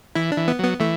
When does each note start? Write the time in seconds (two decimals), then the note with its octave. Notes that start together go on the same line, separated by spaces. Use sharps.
0.15 E3 E4
0.32 D4
0.37 E3
0.48 B3
0.59 F#3
0.64 B3
0.80 E3 A3